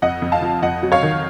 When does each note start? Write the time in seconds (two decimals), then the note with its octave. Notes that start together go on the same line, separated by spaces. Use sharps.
0.02 F2 D#5 F#5
0.22 F2
0.32 F5 A5
0.42 F3
0.62 F2 D#5 F#5
0.83 F#3
0.92 C#5 F5
1.03 D#3